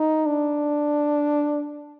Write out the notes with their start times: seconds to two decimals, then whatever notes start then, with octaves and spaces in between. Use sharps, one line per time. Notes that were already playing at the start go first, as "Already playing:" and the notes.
Already playing: D#4
0.26 D4